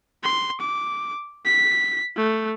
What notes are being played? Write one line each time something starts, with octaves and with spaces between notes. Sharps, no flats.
C6
D6
B6
A3